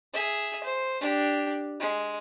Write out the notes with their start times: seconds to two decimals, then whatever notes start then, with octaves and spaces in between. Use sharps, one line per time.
0.13 G#4 E5
0.64 C5
1.01 D4 G4
1.80 G#3